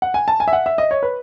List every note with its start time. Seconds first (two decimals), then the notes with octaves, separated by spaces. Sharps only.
0.02 F#5
0.14 G#5
0.28 A5
0.40 G#5
0.48 E5
0.53 F#5
0.66 E5
0.78 D#5
0.91 C#5
1.03 B4